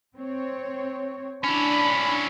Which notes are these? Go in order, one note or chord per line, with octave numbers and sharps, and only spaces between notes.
C4 C#5
C#4 D4 E4 B5